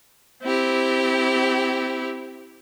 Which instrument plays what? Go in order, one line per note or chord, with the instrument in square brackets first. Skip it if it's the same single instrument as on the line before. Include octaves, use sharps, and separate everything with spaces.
[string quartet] C4 E4 G4